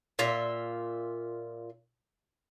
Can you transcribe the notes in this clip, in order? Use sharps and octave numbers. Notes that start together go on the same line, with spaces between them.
A#2 F4 E5